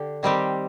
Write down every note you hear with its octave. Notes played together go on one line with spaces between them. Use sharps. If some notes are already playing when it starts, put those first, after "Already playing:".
Already playing: D3 D4 G4
D#3 G3 C4 G4